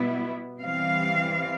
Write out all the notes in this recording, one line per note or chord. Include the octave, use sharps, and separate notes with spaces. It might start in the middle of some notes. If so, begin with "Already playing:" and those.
Already playing: B2 G3 B3 E4
E3 G3 C4 F5